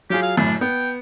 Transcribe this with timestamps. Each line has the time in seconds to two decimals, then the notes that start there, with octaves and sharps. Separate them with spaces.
0.10 F#3 F4 G4 G#4
0.22 F5
0.37 G1 F#2 A2 D4
0.61 B3 G5